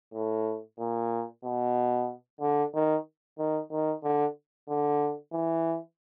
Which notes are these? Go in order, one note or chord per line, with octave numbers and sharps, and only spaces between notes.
A2
A#2
B2
D3
D#3
D#3
D#3
D3
D3
E3